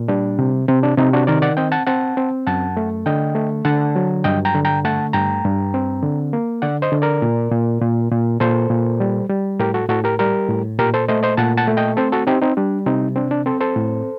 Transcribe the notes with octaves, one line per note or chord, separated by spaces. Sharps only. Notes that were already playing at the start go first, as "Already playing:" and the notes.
Already playing: A#2
G3 D4
C3
C3 C4
D4
C3 C4 D#4
D4 F#4
D#3 A#4 D5
D5 F#5
C4 D#5 G5
F#5 A5
C4 F#5 A5
C4
F#2 F#5 A5
A3
D3 D#5 G5
A3
D3 F#5 A5
F#3
G2 D#5 G5
G5 A#5
D3
G5 A#5
A3 F#5 A5
G2 G5 A#5
G2
C4
D3
A#3
D3 D5 F#5
C5 D#5
D3
A#4 D5
A#2
A#2
A#2
A#2
A#2 A4 C5
A#2
G3
G3
A2 G4 A#4
F#4 A4
A2 F#4 A4
G4 A#4
G3 G4 A#4
A2
A#2 G4 A#4
A4 C5
A3 C5 D#5
C5 D#5
A#2 F#5 A5
F#5 A5
A3
D#5 G5
C4 A4 C5
F#4 A4
C4 D#4 G4
C4 D#4
G3 D4
C3 C4 D#4
C4 D4
D4
C4 A4 C5
A4 C5
A2